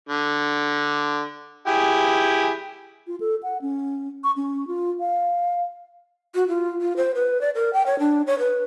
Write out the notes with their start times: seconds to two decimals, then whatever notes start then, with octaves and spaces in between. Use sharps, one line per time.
0.09 D3
1.67 E4 G4 G#4
3.07 F4
3.20 A4
3.43 F#5
3.62 C#4
4.24 C#6
4.37 C#4
4.68 F4
5.00 F5
6.35 F#4
6.48 F4
6.81 F4
6.97 C5
7.15 B4
7.41 D5
7.55 A#4
7.73 G5
7.86 C#5
7.99 D4
8.27 C#5
8.39 B4